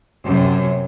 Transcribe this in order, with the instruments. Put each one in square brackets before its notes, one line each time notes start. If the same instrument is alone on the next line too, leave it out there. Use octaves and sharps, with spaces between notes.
[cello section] F#2 C3